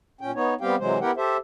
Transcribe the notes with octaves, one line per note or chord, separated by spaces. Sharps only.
A#2 C#4 G5
B3 D#4 C#5
G3 B3 C4 G4 F5 G5
C3 E3 F#3 G#3 C5
B3 E4 G4 A#4 F#5 G5
G4 A4 C5 E5